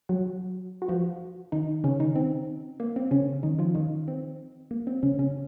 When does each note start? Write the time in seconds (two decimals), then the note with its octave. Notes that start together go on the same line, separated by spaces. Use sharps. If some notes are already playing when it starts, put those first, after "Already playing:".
0.09 F#3 F#4
0.82 F#4
0.88 F3 F4
1.52 D#3 D#4
1.84 C#3 C#4
2.00 D#3 D#4
2.15 C4
2.80 A#3
2.96 C4
3.11 C#3 C#4
3.43 D#3 D#4
3.59 F3 F4
3.75 D#3 D#4
4.08 C4
4.71 A#3
4.87 C4
5.03 C#3 C#4
5.19 C#3 C#4